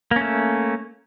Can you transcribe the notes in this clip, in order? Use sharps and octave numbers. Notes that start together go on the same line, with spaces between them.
A3 A#3 C#4